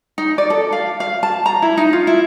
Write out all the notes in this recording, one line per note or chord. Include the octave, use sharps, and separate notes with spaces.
D#4
D5
A4
F5
F5
A5
A#5
E4
D#4
F4
E4